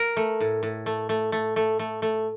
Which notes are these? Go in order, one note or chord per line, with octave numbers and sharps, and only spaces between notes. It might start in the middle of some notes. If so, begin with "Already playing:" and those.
Already playing: A#4
A3
A2
A2
A3
A3
A3
A3
A3
A3